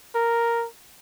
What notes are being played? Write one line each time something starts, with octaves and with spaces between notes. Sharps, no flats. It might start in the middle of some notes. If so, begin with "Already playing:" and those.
A#4